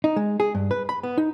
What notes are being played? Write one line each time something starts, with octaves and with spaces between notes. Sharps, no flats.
D#4
G#3
G#4
G2
B4
B5
B3
D#4